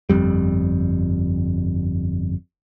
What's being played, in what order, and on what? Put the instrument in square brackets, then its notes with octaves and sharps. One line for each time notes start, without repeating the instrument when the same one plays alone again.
[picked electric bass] G1 F2 G3